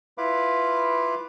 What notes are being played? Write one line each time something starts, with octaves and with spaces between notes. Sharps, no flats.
E4 F4 B4 F5 B5 D6